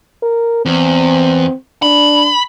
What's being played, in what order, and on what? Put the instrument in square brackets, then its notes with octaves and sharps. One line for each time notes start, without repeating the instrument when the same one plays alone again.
[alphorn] A#4
[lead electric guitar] E2 [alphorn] C4
[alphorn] D4 [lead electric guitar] B5